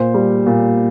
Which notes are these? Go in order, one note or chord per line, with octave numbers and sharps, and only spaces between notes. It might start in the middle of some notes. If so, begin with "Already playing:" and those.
Already playing: A#2 C5
G3
A#2